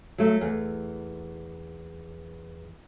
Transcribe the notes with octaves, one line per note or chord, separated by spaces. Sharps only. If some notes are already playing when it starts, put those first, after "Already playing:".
F#3 A3
E2